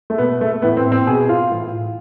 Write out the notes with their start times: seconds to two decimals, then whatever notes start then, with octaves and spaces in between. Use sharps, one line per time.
0.10 A3
0.18 B2 B3
0.41 A3
0.62 A2 E3 B3
0.77 C4
0.92 C4
1.07 B2 G#4
1.29 F4
1.51 A2 E3